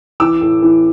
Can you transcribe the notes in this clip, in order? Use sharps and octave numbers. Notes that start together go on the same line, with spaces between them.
E3 D6 E6
A2
E3